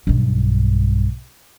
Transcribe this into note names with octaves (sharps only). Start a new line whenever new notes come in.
B1 G2